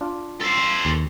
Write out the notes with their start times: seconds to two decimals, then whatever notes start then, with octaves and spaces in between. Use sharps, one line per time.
0.01 D4 F4
0.40 A4 C5
0.85 D#2